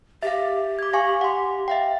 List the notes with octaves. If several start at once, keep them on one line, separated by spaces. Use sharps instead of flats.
G4 E5 F5
D6 G#6
F5 G#5 C#6
F#5 C6
E5 F5 G5